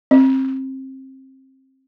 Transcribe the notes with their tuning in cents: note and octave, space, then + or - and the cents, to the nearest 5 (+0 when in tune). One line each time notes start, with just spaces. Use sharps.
C4 +25